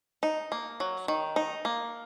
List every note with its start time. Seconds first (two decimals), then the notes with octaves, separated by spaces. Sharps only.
0.23 D#4
0.52 A#3
0.80 F#3
1.08 D#3
1.36 D#4
1.65 A#3